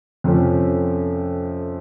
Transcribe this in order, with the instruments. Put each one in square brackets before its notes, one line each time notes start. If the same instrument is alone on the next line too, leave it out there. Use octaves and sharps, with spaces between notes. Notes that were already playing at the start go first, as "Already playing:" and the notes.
[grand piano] F2 C3 F3 A3 C#4